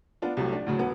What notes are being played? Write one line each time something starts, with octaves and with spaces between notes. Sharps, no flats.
B3 D4 F4
C2 C3 F#3 A3
D4
D2 A2 C#3 F#3
E1 B2 B3